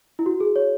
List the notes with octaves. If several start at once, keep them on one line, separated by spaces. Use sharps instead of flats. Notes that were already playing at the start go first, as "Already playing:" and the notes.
E4
F#4
G#4
C#5